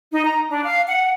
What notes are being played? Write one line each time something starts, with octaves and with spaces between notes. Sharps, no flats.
D#4
A#5
D4
F5
F#5